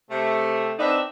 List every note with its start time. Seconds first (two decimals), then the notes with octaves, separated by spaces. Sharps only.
0.10 C3 A3
0.79 B3 C4 D4 D#4 E5